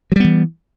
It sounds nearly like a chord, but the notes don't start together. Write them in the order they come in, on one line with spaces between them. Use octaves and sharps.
F#3 G3 B3 E3